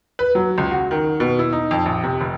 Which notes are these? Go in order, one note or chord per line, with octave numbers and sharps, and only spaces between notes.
B4
F#3
C#2
F#4
D#3
B2
E4
D#4
F2
A#1
C3
F1